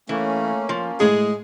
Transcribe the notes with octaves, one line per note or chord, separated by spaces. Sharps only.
E3 A3 A#3 C#4
F3 C6
A2 G#3 G#4